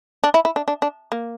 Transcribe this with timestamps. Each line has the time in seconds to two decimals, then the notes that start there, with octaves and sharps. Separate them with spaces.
0.24 D4
0.34 E4
0.45 E4
0.56 D4
0.68 D4
0.82 D4
1.12 A#3